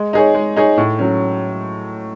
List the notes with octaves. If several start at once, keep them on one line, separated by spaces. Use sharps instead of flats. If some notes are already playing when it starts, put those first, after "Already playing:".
Already playing: G#3
D#4 G#4 C#5
G#3
D#4 G#4 C#5
A2
F#3 C#4